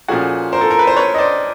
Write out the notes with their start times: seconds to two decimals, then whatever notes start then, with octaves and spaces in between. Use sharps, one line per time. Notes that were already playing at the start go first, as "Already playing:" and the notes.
0.08 A#2 F3 A3 C#4 F#4 G#4
0.53 A#4 C5
0.61 A4
0.70 A#4
0.79 B4
0.87 C5
0.96 B4 C#5
1.14 D#5
1.18 C5 D5